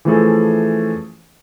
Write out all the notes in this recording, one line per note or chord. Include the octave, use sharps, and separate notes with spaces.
E3 F3 A3 C#4 G#4 A4